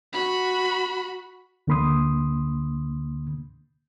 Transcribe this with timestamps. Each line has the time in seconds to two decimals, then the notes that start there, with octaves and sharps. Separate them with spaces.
0.13 F#4 B5
1.67 D2 D3 A#3 B5 C6 D#6